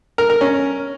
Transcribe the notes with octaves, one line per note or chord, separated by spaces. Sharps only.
A#4
A#4
C#4